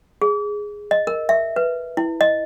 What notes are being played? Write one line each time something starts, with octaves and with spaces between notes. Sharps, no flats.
G#4
D#5
A#4
E5
B4
E4
D#5